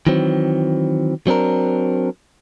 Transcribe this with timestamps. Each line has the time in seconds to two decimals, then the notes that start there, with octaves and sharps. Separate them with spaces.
0.07 D#3 E3 F#3 C4
1.27 F#3 C4 D4 A#4